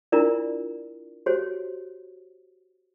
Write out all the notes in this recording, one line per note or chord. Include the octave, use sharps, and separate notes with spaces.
D4 E4 F4 A#4 D5
F#4 G4 C5 C#5